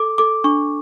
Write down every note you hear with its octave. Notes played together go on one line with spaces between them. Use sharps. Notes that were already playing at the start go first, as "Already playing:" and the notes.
Already playing: A4 D6
A4 D6
D4 C#6